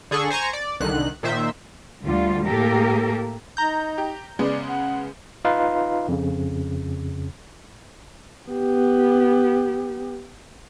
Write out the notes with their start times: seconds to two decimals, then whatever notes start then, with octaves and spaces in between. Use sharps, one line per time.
0.11 D3 G#4 A4 C#6
0.30 C5 G#5 A#5 C#6
0.53 D5
0.80 C2 D3 D#3 F#6
1.23 A#2 D#3 C5 E5
2.05 D2 D3 G3 F4
2.47 A2 A#3 G4 A4 A#4
3.57 D#4 A#5 G6
3.98 G4
4.39 C#3 G#3 B3 D5
4.68 F#5
5.45 D#4 F4 B4 F5
6.08 F2 C#3
8.48 B3 G4